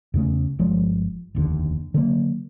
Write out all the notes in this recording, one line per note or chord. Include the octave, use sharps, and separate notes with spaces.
E2 C#3 A3
G1 F3 G#3
F1 D#2 D3
D3 F#3 A#3